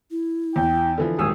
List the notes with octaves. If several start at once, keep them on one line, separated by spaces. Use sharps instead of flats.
E4
E2 G5
D3 E3 F3
D#1 G#1 G#4 E6